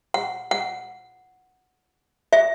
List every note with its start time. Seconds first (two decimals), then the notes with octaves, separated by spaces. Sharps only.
0.14 F#5
0.51 F#5
2.33 E5